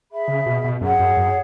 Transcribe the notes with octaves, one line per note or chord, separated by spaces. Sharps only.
G#4 E5 B5
C#3
B2
B2
F#2 G#4 C#5 F#5
F#2
F#2